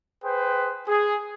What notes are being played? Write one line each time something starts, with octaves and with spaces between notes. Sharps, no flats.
G#4 B4 C5 G5
G#4